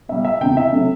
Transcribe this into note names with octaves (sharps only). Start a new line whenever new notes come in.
B2 G3 E5
E5
E2 C3 E3 G5
E5
C3 F#3 A3